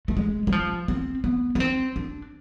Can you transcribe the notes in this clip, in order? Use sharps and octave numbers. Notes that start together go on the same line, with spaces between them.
A3
G#3
G#3
F3
C4
B3
D4
C4
D4